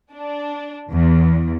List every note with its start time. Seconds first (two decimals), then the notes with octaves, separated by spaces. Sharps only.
0.14 D4
0.91 E2